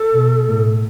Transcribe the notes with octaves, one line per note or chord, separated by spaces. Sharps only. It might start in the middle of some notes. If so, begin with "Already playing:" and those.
Already playing: A4
B2
A2